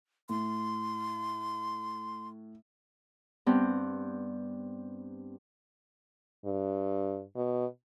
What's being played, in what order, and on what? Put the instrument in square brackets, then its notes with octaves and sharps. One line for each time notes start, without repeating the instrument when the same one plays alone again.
[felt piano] A2 [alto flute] C6
[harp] G2 B3 C4
[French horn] G2
B2